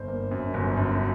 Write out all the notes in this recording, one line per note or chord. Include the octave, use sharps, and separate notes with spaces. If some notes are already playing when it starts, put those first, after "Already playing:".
Already playing: G1 C5
A#3
F#2
G1
F#2